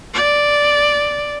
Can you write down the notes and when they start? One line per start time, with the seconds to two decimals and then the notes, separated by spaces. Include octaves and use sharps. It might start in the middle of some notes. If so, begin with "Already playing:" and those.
0.14 D5